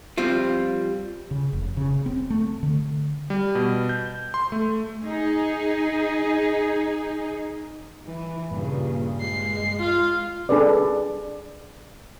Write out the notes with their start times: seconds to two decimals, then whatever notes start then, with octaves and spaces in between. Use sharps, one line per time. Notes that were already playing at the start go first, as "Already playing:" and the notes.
0.18 F3 G3 C4 F4
1.31 C#3
1.53 F1
1.77 C#3
2.06 C4
2.30 A3
2.63 D3
3.30 G3
3.55 B2
3.89 G6
4.34 C6
4.52 A3
5.02 D#4 G#4
8.06 E3
8.50 G2 A#2 C#3
9.21 G#3 C7
9.79 F4 F5
10.49 D4 G#4 A4 B4 D5